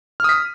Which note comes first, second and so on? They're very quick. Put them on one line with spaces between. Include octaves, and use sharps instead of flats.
F6 D#6 B6